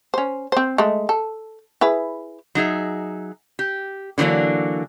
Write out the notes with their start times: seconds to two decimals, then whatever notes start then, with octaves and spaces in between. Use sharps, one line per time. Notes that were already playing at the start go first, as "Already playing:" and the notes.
0.14 C#4 C5
0.52 C4 C5
0.78 G#3 A3
1.09 A4
1.81 E4 G#4 B4
2.55 F#3 D#4 G#4 E5
3.59 G4
4.18 D3 E3 F#3 A#3 D4